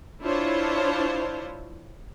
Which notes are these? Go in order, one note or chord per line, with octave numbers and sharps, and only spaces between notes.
D4 E4 F4 C5 C#5